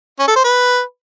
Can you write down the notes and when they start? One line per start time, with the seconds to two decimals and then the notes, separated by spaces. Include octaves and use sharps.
0.20 C#4
0.28 A4
0.36 C5
0.44 B4